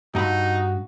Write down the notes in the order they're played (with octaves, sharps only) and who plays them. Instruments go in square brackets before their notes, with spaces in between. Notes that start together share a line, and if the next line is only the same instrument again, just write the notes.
[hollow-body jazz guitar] G2 B5 [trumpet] D#4 [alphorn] F#4